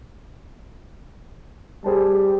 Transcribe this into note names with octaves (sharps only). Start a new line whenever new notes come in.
G3 G#4 C5 A5